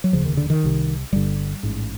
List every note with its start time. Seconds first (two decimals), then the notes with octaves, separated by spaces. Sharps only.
0.04 F#3
0.12 F1 D#2 C#3 F3
0.25 D#3
0.37 D3
0.50 D#3
0.63 C2 C3
1.12 G1 G2 D3 G3
1.63 A1 G#2